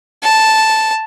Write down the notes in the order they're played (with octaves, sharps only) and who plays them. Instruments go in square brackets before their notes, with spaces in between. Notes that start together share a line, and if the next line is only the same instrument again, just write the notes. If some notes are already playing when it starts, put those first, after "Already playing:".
[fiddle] A5